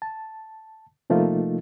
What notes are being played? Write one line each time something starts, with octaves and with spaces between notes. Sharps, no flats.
A5
C3 F3 A3 A#3 D#4 F4